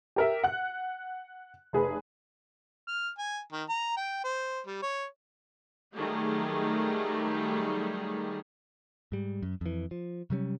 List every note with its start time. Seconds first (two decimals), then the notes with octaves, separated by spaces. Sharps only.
0.16 G4 A#4 E5
0.44 F#5 F#6
1.73 F1 G#4 B4
2.88 F6
3.18 G#5
3.52 D#3
3.69 A#5
3.97 G5
4.24 C5
4.66 G3
4.82 C#5
5.94 D#3 F#3 G3 A3 G4 G#4
9.12 G#2 G3
9.42 F#2
9.61 F2 E3
9.91 F3
10.30 C3 F#3 G3 C#4